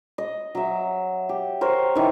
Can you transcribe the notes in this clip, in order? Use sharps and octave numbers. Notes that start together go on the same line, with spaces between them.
D#5
F#3 E5
G4
A#4 C5 C#5
D#3 E3